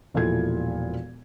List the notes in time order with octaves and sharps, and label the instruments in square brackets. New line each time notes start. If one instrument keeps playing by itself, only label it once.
[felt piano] E1 A#2 F3 E4 A4 G#6